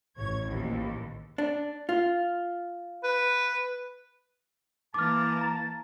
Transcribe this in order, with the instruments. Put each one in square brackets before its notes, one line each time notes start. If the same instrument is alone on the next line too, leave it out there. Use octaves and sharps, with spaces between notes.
[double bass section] A1 [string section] C#5 G#6
[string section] A#1 D#2
[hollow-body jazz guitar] D4
F4
[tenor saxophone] B4
[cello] E3 A#3 [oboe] A5 [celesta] D6 F6
[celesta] A#5